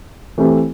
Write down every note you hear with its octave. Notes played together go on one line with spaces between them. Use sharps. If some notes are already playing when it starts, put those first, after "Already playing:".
E3 A3 C4 E4 G4